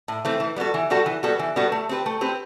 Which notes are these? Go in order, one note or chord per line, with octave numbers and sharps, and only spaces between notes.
A2
E3 A3 C4
E3
G3 B3 F#4 A4
E3
G3 B3 F#4 A4
E3
G3 B3 F#4 A4
E3
G3 B3 F#4 A4
A3
C4 G4 B4
A3
C4 G4 B4